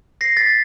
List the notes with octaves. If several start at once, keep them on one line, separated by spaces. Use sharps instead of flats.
A#6 C7
A6 B6